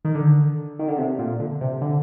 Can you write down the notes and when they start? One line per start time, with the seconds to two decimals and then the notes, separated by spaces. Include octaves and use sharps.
0.05 D#3
0.15 D3
0.79 D#3
0.88 D3
0.98 C3
1.19 A#2
1.39 D3
1.61 C3
1.81 D3